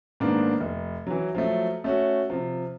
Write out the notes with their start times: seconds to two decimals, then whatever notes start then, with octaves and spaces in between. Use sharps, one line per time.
0.20 G#2 D#3 A#3 B3 D4
0.60 F1
1.07 E3 F#3
1.35 F3 F#3 A3
1.84 A3 C#4 F#4
2.30 C3 F3